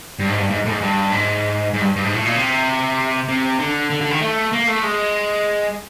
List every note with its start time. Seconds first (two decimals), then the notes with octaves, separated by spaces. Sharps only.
0.19 G2
0.29 G#2
0.39 G2
0.50 G#2
0.65 A2
0.71 G#2
0.81 G2
1.12 G#2
1.74 G#2
1.81 G2
1.96 G2
2.05 G#2
2.15 A2
2.25 A#2
2.36 C3
3.28 C3
3.59 D3
3.90 D3
4.01 D3
4.10 D#3
4.21 A3
4.53 A#3
4.68 A3
4.84 G#3